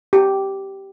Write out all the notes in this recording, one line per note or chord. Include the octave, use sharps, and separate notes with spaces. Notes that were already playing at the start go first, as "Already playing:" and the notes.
G4